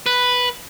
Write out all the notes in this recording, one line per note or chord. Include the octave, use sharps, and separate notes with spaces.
B4